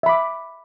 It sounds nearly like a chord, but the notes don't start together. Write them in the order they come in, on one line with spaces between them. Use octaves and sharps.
E5 B5 D6